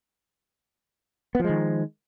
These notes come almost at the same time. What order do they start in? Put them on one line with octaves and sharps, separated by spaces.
B3 F3 G#3 D#3